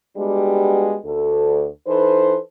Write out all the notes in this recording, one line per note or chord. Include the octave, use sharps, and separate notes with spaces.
G3 G#3 B3 D4 F#4 G4
D2 A4
E3 D#4 A4 B4 C5